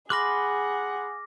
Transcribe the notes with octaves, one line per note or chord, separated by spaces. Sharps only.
G#4 F#5 B5 C6 D6 F6 F#6 A#6